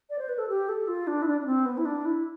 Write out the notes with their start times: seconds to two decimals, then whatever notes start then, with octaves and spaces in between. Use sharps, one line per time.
0.10 D5
0.18 C5
0.29 B4
0.38 A4
0.49 G4
0.69 A4
0.88 F4
1.07 D4
1.22 E4
1.27 D4
1.41 D4
1.46 C4
1.65 B3
1.77 E4
1.85 D4
2.05 E4